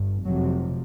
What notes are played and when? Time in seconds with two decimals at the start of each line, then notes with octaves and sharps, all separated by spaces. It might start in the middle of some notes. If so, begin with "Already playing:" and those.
Already playing: G1 G2
0.25 F1 F2 C3 F#3